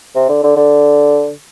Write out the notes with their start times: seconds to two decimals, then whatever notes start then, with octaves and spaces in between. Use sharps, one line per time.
0.15 C3
0.28 D3
0.44 D3
0.56 D3